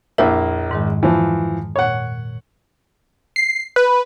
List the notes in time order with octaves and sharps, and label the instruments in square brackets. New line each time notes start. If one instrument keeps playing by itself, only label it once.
[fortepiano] A#1 A#3 E5 [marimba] F2 E4 G6
[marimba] G#2 D#3 G#3
[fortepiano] E3 F3
[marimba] A#2 [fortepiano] C#5 F#5
[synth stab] C7
B4